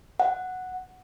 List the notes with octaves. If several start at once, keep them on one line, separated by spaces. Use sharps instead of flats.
F#5